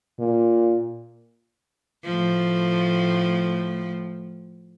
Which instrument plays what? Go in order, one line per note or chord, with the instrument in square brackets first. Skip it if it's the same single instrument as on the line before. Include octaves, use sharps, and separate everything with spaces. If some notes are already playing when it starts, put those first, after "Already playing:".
[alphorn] A#2
[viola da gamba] A2 F3